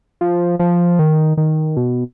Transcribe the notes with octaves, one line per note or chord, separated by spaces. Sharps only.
F3
F3
D#3
D#3
B2